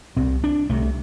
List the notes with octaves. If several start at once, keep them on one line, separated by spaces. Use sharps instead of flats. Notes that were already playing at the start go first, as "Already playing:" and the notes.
C2 C3 C4
D4
C2 C3 A3